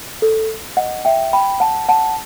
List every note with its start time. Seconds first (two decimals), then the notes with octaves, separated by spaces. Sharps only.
0.22 A4
0.77 D#5 F#5
1.05 E5 G5
1.33 G5 B5
1.60 F#5 A5
1.89 F#5 A5